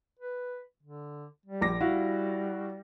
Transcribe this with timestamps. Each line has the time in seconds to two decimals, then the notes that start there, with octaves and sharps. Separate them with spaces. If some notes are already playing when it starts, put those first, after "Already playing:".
0.20 B4
0.83 D3
1.46 G3
1.61 A#1 D6 A#6
1.81 G3 E4 F#4 F5